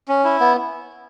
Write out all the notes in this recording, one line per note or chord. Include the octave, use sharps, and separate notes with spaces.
C#4
E4
B3